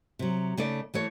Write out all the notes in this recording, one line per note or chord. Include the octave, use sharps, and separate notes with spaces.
C3 F#3
C#3 A3 D#4 D5
E3 A3 C#5